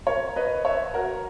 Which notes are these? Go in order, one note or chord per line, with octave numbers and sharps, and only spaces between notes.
A#4 C#5
B4 D#5
C#5 E5
F#4 A#4